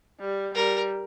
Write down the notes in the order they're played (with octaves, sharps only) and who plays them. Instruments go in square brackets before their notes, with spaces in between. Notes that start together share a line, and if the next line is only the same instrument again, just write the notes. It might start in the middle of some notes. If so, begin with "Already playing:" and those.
[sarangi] G3
[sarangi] G3 [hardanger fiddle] A#4